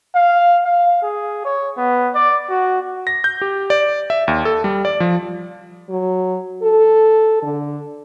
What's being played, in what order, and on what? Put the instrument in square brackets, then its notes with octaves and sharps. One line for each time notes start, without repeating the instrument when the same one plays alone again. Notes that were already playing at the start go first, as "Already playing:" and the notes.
[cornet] F5
F5
G#4
C#5
B3
D5
F#4
[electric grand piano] A#6
G6
G4
D5
E5
D#2
A4
G3
D5
F3
[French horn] F#3
A4
D3